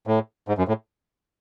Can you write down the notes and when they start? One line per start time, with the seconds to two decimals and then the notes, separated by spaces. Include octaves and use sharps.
0.07 A2
0.48 G#2
0.58 F#2
0.68 A2